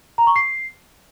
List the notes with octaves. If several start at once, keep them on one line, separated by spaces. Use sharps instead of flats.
A#5
C#6
C7